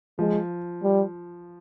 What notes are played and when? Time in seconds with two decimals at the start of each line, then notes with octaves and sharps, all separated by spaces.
0.19 F3 G#3
0.83 G3